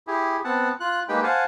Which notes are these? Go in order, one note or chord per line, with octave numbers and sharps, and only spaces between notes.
E4 G4 G#4
B3 C4 F#5 A5
F4 F#6
G#3 A#3 D#4 G4 B4 G5
C5 F5 F#5 G#5 A5